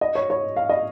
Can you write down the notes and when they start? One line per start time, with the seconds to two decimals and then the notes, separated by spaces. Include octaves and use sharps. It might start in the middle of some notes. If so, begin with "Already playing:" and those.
0.01 D#5
0.15 C#5
0.30 C#5
0.56 F5
0.69 D#5